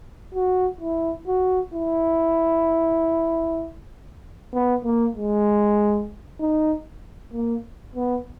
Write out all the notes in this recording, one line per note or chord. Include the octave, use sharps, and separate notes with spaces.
F#4
E4
F#4
E4
B3
A#3
G#3
D#4
A#3
B3